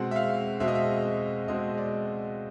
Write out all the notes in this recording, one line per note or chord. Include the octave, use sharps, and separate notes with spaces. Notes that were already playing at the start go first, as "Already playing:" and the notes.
Already playing: B2 G#3 C4 F#5
E5
F5
B2 G#3 C4 E5
D#5
E5
B2 G#3 C4 D#5
D5